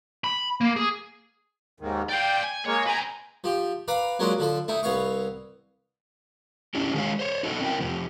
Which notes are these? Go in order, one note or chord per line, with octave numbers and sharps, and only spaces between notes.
B5
A#3
G#4
D#2 G#2 D#3
D5 F5 G5
G#5
G#3 A#3 C#5
B4 G5 G#5 A#5
F3 G4
B4 D5 F5 A#5
F#3 G#3 A#3 C#4 D4 F4
D3 F3 A4
A3 D#4 E4
C2 B3 C#5 F5 C#6
C#4 D4 E4 G4
D#3 G#3 G#4 A4 C#5 F5
C5 C#5
D#4 F#4 A4 D#5
C4 C#4 E4 A#4 G5
F2 C3 F3